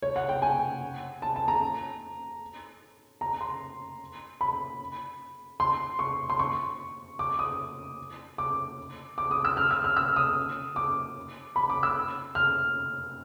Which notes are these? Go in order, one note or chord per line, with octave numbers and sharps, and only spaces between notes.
C#5
F#5
G5
G#5
A5
A5
A#5
A#5
C6
B5
C6
C#6
C6
C#6
D6
D#6
D6
D6
D#6
E6
F6
E6
F6
E6
D#6
D6
B5
D6
E6
F6